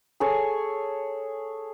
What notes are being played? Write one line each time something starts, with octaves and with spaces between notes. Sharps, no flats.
G#4 A4 C#5 G#5